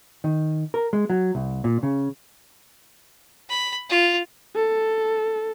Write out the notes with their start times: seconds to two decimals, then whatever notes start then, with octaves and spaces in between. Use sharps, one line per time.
0.24 D#3
0.74 A#4
0.93 G#3
1.10 F#3
1.35 C2
1.64 A#2
1.83 C#3
3.49 B5
3.90 F4
4.56 A4